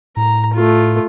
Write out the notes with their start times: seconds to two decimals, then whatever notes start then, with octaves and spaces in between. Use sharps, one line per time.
0.17 A2 A#5
0.54 A3 F4